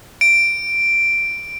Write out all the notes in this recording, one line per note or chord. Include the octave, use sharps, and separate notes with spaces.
D7